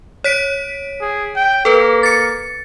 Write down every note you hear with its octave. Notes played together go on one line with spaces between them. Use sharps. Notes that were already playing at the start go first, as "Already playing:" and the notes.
C#5 B6 D7
G#4
G5
A#3 A4 B4
A6 C#7